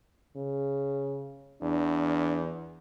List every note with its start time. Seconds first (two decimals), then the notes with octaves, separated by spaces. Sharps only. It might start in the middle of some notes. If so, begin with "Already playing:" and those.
0.36 C#3
1.62 E2 D4